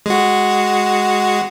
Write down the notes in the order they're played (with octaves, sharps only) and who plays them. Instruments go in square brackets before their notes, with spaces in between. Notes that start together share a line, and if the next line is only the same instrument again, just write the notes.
[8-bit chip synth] G#3 F#4